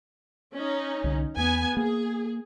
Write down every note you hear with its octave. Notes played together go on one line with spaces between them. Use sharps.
C#4 D#4
C2 D3
E2 B3 G#5
A#3 G#4